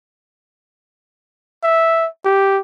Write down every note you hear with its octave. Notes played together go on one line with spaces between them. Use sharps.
E5
G4